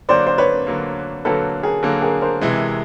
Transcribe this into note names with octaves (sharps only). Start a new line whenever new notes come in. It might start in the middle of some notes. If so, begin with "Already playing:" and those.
D3 F#3 A#3 C5 D5
C5
B4 C#5
D3 F#3 A#3
D3 F#3 A#3 A4 B4
G#4 A#4
D3 F#3 A#3 A4
G#4 A#4
A#4 C5
C3 E3 G#3